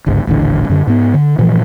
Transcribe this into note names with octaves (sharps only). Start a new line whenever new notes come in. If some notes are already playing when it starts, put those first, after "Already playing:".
G1 C#2 G#2
D#1 A1 D3
F#2 D3
G#2 B3
D3
G2 A#2 E3 F3